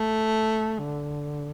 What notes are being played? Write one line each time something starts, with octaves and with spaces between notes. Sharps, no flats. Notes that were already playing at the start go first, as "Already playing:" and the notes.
Already playing: A3
D3